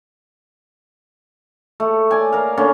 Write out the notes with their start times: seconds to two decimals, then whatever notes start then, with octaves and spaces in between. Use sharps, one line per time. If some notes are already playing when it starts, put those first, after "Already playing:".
1.80 A3
2.11 D5 G#5
2.32 A#4 F5
2.57 D3 A#3 C#4